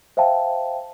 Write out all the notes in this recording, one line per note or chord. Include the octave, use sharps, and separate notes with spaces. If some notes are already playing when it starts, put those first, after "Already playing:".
C5 E5 F5 G5 A5